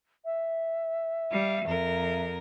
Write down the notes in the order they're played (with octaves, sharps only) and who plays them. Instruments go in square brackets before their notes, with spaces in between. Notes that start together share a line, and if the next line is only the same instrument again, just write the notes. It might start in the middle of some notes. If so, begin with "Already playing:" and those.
[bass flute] E5
[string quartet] G3 F5
F2 A#4